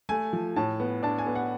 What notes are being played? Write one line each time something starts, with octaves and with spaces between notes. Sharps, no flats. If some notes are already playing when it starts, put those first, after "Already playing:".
A3 G#5
F3
A2 A5
B3
D4 A5
G#5
B3
F#5